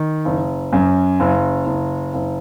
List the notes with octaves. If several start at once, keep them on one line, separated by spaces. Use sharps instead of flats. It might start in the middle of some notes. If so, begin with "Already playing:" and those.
Already playing: D#3
F#1
F#2
F#1
F#1
F#1